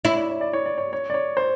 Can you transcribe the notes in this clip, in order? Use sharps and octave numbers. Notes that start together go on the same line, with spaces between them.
E4 C#5
D5
C#5
D5
C#5
D5
C#5
C#5
D5
C#5
C5